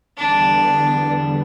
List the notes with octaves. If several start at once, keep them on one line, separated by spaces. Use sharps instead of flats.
E2 D3 G3 B3 D4